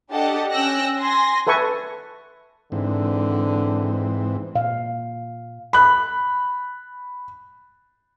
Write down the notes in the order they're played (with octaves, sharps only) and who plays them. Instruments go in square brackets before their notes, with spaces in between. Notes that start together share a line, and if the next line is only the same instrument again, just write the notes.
[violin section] D4 G4 A4 D#5 F#5 A5
C#4 G5 E6 F#6 A#6
G#5 C6 A#6
[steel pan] A4 B4 E5 G#5 C#6
[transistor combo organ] G#2 E3 C4 [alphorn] D3
[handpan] A#2 F5
[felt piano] B5 F#6